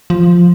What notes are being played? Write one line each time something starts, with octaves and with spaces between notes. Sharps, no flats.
F3